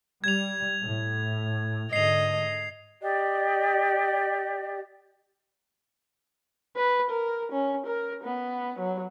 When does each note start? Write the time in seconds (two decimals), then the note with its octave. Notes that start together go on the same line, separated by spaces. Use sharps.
0.24 G3 G#6 F7
0.83 A2
1.93 G#2 D3 D#5 C7 F7
3.01 G4 D5 D#5
6.76 B4
7.10 A#4
7.52 C#4
7.87 A#4
8.24 B3
8.80 F#3